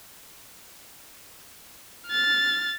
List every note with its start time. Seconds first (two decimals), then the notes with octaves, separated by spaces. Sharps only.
2.07 F6 A6